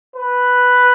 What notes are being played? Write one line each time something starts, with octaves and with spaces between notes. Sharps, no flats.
B4